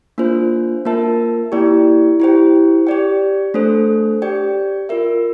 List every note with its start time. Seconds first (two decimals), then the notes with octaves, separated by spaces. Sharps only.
0.18 A#3 D4 F4 C5
0.85 A#3 F4 A#4 E5 A5
1.52 A#3 E4 G4 D5 G5
2.20 E4 G4 C5 G5
2.87 G4 D5 G5
3.54 A3 D4 A4 C5
4.22 G4 D5 G5
4.89 F4 A#4 E5